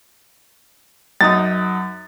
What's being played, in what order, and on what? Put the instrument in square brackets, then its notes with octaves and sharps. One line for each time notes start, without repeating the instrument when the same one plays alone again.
[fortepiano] F#2 D#4 D#6 [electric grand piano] A6